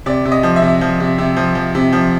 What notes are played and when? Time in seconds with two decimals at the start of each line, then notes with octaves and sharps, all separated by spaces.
0.06 C3 D5
0.25 C3
0.32 D#5
0.43 F3
0.56 E5
0.62 C3
0.81 F3
1.00 C3
1.18 C3
1.36 F3
1.55 F3
1.75 C3
1.93 F3